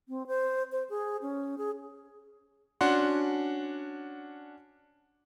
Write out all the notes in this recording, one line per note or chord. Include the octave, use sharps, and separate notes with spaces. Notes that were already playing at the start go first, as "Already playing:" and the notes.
C4
C5
C5
G#4
C#4
G#4
C#4 D4 F#4 F#5 C6